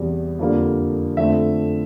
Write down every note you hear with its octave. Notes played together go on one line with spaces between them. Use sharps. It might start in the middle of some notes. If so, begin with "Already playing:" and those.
Already playing: E2 C3 G3
F2 D3 G3 A#3
F2 D3 A3 C4 E5